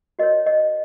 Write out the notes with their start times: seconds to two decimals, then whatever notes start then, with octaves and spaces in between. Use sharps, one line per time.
0.19 F#4 A#4 C#5 D#5
0.46 D#5